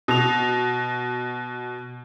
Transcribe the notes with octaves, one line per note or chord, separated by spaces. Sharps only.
B2 F7